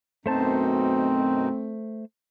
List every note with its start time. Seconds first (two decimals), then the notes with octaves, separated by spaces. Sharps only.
0.26 F#2 B2 A3 C4 D#4 C5 A5